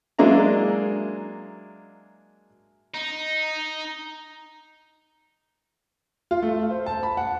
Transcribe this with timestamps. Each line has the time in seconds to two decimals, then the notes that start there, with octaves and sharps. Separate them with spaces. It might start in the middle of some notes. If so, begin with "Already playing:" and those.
0.19 F#3 G#3 A#3 D4 E4 A#5
2.94 D#4
6.31 F4
6.43 A3
6.70 C5
6.86 A5
7.03 B5
7.17 F#5